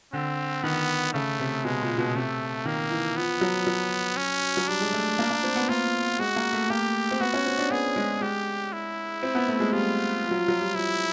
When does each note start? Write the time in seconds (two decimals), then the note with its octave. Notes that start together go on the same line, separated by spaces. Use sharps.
0.13 D3 C4
0.63 D#3 B3
1.13 C#3 A3
1.39 C3
1.64 B2 G#3
1.82 A#2
1.98 B2
2.15 C3 A3
2.65 D#3 A#3
2.91 E3
3.16 F3 B3
3.41 F#3
3.58 F3
3.67 F#3
4.17 C#4
4.57 F#3
4.68 G3 D4
4.81 G#3
4.93 A3
5.19 A#3
5.30 A#3
5.43 C4
5.56 B3
5.69 A#3 F4
6.19 G#3 F#4
6.36 A#3
6.53 A3
6.70 A#3 G4
7.11 C4
7.20 B3 F#4
7.34 C#4
7.46 C4
7.59 D4
7.71 B3 G#4
7.96 G#3
8.21 G#3 G4
8.73 E4
9.23 C4
9.35 B3
9.48 A3
9.60 G#3
9.73 G3 F4
10.24 F3
10.31 F#3
10.36 F3
10.48 F#3
10.62 G3
10.74 F3 E4